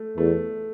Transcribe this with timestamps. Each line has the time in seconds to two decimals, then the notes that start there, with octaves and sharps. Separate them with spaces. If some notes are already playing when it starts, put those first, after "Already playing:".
Already playing: A3
0.17 E2 A3